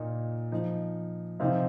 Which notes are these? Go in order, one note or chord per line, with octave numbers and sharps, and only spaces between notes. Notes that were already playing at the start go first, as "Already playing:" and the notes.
Already playing: A#2 A#3 D#4
F3 D#4
C3 F3 C4 D#4 F5